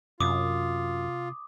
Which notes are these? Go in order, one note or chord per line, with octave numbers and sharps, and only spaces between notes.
F#2 C3 F4 D6 D#6